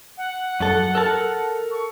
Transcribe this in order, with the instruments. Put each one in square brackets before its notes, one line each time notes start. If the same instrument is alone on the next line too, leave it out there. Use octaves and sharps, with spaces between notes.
[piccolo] F#5
[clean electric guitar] F#2 A4
A4 A#4 A5
[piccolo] C#6